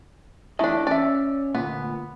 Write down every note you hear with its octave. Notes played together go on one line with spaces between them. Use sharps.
E2 A3 D4 E4 D#5
C#4 D5 E5
D2 A#2 B3